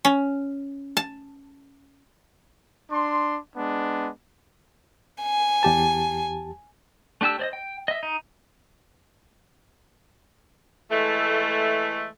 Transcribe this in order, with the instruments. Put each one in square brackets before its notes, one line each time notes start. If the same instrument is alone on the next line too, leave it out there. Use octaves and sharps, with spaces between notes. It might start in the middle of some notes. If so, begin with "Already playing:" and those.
[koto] C#4
A5
[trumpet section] D4 C6
G#3 B3 D4
[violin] G#5
[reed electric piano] E2 G4 A5
[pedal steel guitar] A3 D4 G4 A5 E6
C5 D5 D#5
G5
D#5 E5
D#4
[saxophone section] E3 G#3 A3